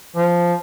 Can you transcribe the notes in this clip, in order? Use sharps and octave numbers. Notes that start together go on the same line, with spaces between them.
F3